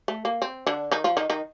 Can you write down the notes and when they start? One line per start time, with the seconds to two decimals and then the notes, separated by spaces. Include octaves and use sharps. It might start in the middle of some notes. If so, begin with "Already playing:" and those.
0.08 A3
0.25 A#3
0.42 C4
0.67 D3 D4
0.92 D#3 D#4
1.04 F3 F4
1.17 D#3 D#4
1.30 D#3 D#4